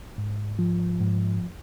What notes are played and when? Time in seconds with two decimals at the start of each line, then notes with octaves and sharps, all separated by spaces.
0.18 G#2
0.59 F3
1.01 G#2